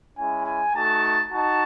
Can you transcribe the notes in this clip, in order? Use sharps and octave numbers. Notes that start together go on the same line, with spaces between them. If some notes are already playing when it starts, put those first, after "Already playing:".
G#3 C#4 E4 G#5
G#5
A3 D#4 F#4 A5
D#4 F#4 A5